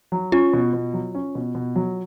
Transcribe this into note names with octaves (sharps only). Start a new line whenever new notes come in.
F#3
C#4 F4
B2
B2
F#3
C#4
B2
B2
F#3